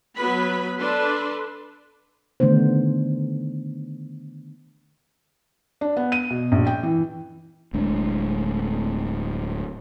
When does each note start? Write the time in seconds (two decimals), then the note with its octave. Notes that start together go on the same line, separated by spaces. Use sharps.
0.16 F#3 B3 B4 B5
0.78 D4 A4 B4 C6
2.40 D3 D#3 A3 B3 D4 C5
5.81 D4
5.97 B3
6.12 D#7
6.30 B2
6.52 A#1
6.67 G5
6.83 E3
7.73 D1 A2 G#3 D4